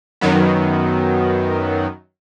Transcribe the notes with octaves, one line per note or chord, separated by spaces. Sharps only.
F#2 D#3 F#3 B3